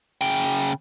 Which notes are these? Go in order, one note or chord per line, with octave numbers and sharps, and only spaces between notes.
C#3 G5